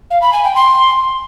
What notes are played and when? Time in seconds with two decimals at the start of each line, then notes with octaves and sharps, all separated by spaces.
0.11 F5
0.22 B5
0.33 G#5
0.44 G5
0.55 C6